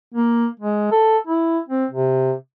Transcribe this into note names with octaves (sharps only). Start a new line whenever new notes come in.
A#3
G#3
A4
E4
C4
C3